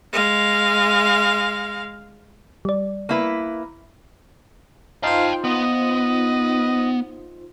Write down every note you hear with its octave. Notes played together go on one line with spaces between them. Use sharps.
G#3 F5
G3 D5
A#3 E4 B4
D#4 F4 C5 F5 G5 A5
B3 D#5